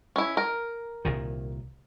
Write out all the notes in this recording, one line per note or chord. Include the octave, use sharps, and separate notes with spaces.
C#4 E4
A#4
C2 A#2 D#3